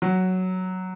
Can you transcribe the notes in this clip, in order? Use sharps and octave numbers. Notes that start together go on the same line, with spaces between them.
F#3